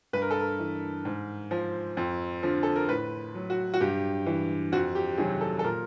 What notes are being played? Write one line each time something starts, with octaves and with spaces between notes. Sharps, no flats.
G2 B4
A#4
A4
A#4
E3
G#2
F3
F2
D3 F3
A4
A#4
A2 B4
F#3
F#4
F#4
G2 G4
E3
F2 F#4
G4
C3 D#3 F#3 G#4
A4
A4
A#2 A#4